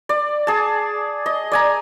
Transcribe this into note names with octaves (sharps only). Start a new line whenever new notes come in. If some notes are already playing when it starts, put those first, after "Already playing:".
D5
G#4 A5
D#5
D5 G#5 A#5